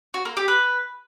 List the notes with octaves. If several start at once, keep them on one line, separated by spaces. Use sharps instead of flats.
F#4
A#3
G4
B4